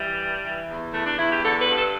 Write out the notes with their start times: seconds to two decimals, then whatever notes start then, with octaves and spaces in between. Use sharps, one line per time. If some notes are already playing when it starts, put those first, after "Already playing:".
Already playing: E3 G3
0.19 G2
0.44 E3
0.69 E2
0.93 E3 A3
1.06 D4
1.18 E2 E4
1.31 G4
1.43 D3 A4
1.60 B4
1.68 G2
1.77 A4